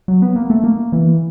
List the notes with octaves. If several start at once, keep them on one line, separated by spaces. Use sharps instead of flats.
F#3
B3
A#3
A3
A#3
E3